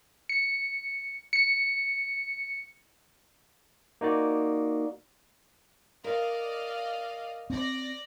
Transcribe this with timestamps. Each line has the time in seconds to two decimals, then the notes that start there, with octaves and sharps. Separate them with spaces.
0.29 C#7
1.33 C#7
4.01 A#3 D#4 F#4 D5
6.04 A#4 D5 D#5 F5
7.50 C4 D5 A#6